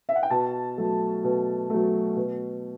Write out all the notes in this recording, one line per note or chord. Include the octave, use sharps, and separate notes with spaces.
E5
F#5
G5
B2 A5
F#3 A3
B2
F#3 A3
B2